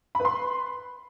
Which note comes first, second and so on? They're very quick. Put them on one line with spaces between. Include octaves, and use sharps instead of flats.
B5 B4 C6